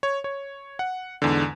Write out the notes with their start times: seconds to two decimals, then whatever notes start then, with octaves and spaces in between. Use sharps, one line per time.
0.03 C#5
0.24 C#5
0.79 F#5
1.22 E2 G#2 D3